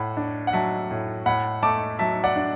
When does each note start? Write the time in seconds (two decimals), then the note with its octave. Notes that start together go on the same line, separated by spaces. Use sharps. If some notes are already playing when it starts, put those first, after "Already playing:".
Already playing: A2 F#5 B5
0.17 D4
0.47 F#5
0.53 F#3 E5 A5
0.91 A2
1.26 A2 F#5 B5
1.63 A3 A5 D6
1.99 F#3 E5 A5
2.24 D5 F#5
2.36 D4